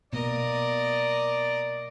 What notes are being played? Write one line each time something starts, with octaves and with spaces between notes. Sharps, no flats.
B2 A#3 A#4 D5 D#5